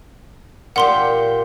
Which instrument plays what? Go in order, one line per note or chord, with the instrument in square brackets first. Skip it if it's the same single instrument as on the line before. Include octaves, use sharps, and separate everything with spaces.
[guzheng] A#2 G4 [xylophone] F#5 C6 G7